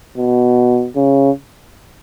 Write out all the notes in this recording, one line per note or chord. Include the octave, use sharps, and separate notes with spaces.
B2
C#3